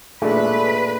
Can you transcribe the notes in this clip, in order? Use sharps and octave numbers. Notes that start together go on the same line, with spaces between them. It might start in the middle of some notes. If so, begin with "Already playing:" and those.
A#2 G#3 A3 D4 B4